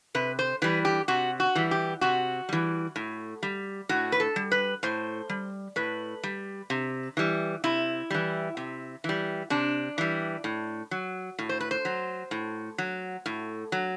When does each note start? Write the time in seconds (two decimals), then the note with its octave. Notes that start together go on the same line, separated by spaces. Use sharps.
0.15 C3 B4
0.39 C5
0.62 E3 G3 B4
0.85 G4
1.08 C3 F#4
1.40 F#4
1.55 E3 G3
1.71 G4
2.01 C3 F#4
2.49 E3 G3
2.96 A2
3.43 G3
3.89 A2 F#4
4.12 B4
4.20 A4
4.36 G3
4.52 B4
4.83 A2 C5
5.29 G3
5.76 A2 B4
6.23 G3
6.70 C3
7.17 E3 G3
7.64 C3 E4
8.11 E3 G3
8.57 C3
9.04 E3 G3
9.50 C3 D4
9.98 E3 G3
10.44 A2
10.91 F#3
11.39 A2
11.49 C5
11.61 B4
11.71 C5
11.85 F#3
12.31 A2
12.78 F#3
13.26 A2
13.72 F#3